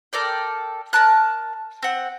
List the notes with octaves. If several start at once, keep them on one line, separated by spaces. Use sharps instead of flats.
A4 A#4 D5 G5
A#4 D5 A5 F#6
C4 F#5